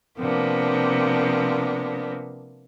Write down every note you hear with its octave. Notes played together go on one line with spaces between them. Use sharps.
C3 F3 A#3 B3 D4